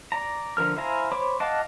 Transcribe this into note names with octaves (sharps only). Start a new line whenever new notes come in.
D5 A#5
D3 F3 A#4 F6
E4 C5 F5 G#5 A#5
C5 C#5 B5 D6
D#5 F5 F#5 A5 D6